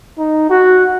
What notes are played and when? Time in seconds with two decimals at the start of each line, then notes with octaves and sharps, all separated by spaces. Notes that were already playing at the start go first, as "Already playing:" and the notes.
0.18 D#4
0.50 F#4